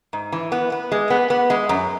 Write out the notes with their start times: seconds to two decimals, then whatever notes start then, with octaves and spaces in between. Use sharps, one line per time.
0.13 G#2
0.32 E3
0.52 B3
0.72 B3
0.92 G#3
1.10 B3
1.30 B3
1.50 G#3
1.69 F#2